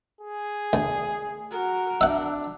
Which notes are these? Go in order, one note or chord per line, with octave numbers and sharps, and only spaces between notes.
G#4
D2
F#4 A#4
D4 E5 F#5